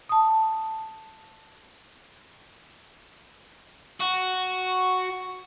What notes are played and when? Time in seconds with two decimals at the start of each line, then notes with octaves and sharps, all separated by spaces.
0.09 A5 D#6
4.00 F#4